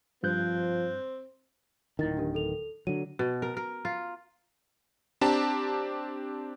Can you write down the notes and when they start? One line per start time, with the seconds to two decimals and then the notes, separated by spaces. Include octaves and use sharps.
0.23 G2 F3 C4 F#6 G6
1.99 D1 D#3 E4 A6
2.17 D4 G4 A#4
2.34 A4 F7
2.87 D3 F#3 D#7
3.19 B2
3.42 A#4
3.57 A#4
3.85 F4
5.21 C4 D4 G4 A5 A#5